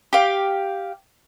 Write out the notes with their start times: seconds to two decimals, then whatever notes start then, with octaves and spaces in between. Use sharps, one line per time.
0.13 G4 F5